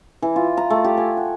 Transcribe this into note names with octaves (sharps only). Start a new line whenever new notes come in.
E3
F4
A#5
A3
G4
G#5
F#5